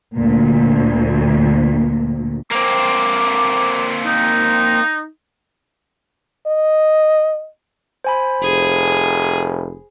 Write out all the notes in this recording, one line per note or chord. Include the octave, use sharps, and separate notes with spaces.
D2 A#2
A#3 C4 D6
D#4
D#5
C5 G#5 B5
F1 G#4